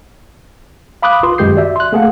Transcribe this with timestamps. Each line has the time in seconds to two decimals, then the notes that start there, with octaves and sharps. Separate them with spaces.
1.02 F5 B5 D6 D#6 F#6
1.23 F4 B4 C6 D#6
1.38 F#2 D#3 G#3 G4 G6 C7
1.56 F#4 D5 E5
1.76 C6 F#6
1.92 A3 A#3 G#4 A4 F5 F#5